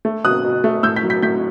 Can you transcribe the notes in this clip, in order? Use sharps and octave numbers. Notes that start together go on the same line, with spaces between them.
A3
B2 D#6 F#6
B2
A3
A2 E6 G6
G6 B6
F#3
G6 B6
A2 G6 B6